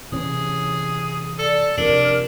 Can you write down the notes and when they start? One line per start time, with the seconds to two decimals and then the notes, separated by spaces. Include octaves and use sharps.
0.12 C3 E3 C#4 G#4
1.39 A4 D5
1.78 C3 F3 D4 A#4